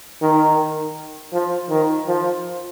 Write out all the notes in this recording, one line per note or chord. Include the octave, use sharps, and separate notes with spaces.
D#3
F3
D#3
F3